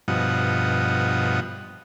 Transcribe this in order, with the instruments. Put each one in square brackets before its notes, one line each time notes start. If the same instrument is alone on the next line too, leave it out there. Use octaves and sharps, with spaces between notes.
[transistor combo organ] G2 B2 F3 D#5 F#5